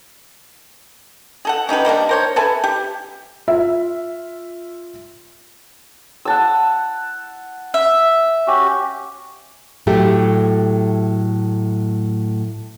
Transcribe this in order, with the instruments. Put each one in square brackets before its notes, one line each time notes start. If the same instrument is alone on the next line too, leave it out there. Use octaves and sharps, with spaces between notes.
[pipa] G#4 A4 F#5
C#4 D#4 G4 B4
D#3 G3 A#3 D4
A#4 C5 C#5
A4 B4 E5 G#5
G4
[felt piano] F4 E5
[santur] F#5 A5 E6
[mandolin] E5
[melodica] C#4 F#4 G4
[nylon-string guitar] A2 F#3 A3 G4